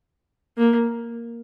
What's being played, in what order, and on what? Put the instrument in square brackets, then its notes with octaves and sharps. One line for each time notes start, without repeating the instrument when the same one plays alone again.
[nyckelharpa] A#3